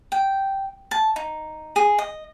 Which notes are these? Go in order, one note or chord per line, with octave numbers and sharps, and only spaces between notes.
G5
A5
D#4
G#4
D#5